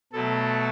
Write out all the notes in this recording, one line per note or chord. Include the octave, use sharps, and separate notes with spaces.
B2 F#3 A3 A4